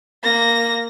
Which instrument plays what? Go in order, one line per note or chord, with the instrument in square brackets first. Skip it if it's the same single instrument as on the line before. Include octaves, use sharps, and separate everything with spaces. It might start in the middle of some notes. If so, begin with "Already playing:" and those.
[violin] A#3 A#6